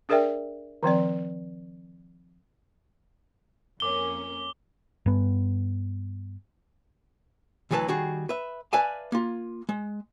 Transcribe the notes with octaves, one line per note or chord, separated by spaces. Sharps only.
D4 G#4 A#4 D5 E5 G5
D#3 F3 C4 D5
F2 A#3 C#4 D6 G7
G2 B3
D2 E3 F#3 G#4 B4 A5
D#3 G3 F#4 G#4
B4 E5
B4 D5 E5 F5 G#5 A5
A#3 F4
G#3